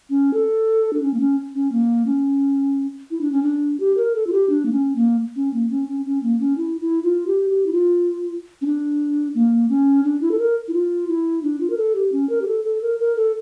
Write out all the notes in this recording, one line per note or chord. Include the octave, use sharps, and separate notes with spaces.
C#4
A4
D4
C#4
A#3
C#4
C#4
A#3
C#4
E4
D4
C#4
D4
G4
A#4
A4
F4
G4
D4
A#3
C#4
A#3
C#4
A#3
C#4
C#4
C#4
A#3
C#4
E4
E4
F4
G4
G4
E4
F4
C#4
D4
A#3
C#4
D4
E4
A4
A#4
E4
F4
E4
D4
F4
A#4
A4
G4
C#4
A#4
G4
A4
A4
A#4
A#4
A4